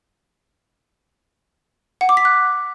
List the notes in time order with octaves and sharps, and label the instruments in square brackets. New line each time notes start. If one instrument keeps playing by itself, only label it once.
[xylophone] F#5
D6
B6
F#6